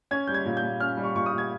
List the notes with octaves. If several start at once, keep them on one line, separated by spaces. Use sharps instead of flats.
C#4 G#6
G3 G6
G#6
A#2
G6
A#2
C#4 F6
G3
C#6
A#2 C#6
D#6
A#2
G#6